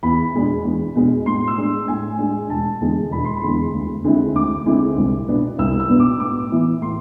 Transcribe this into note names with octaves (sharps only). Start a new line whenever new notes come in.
E2 B5
B2 G#3 D4
E2
B2 G#3 D4
A2 C6
E6
G#3 D4
A2 G#5
G#3 D4
E1 A5
E2 D3 G#3
E1 B5
C6
B5
E2 D3 G#3
D2
D3 G#3 C4 E4
D2 D6
D3 G#3 C4 E4
C2
B2 B3 D4
C2 E6
E6
B2 B3 D4
D6
A2 D6
E3 B3 E4
A2 C6